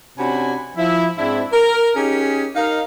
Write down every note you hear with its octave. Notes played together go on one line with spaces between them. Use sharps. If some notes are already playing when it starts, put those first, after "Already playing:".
C3 C#4 D4 F#4 G#5 B5
F3 E4
G#2 C4 D4 E4
A#4
C#4 D#4 G4 G#4
D#4 A#4 D#5 F5